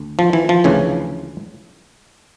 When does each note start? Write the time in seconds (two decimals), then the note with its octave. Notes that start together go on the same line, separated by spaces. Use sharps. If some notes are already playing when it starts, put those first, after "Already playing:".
Already playing: D2
0.19 F3
0.33 E3
0.49 F3
0.64 D2 C#3 E3